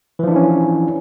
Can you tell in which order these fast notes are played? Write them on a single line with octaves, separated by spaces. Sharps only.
E3 F3 D4 E4 C#4